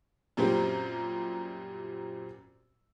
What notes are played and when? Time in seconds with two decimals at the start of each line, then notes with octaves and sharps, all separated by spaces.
0.37 F#2 A#2 F#3 G3 A#3 C4